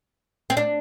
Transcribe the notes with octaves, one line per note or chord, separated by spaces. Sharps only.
C4
D4